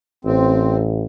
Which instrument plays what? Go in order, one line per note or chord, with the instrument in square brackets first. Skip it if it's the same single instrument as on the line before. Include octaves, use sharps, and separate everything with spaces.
[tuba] A1 [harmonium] C4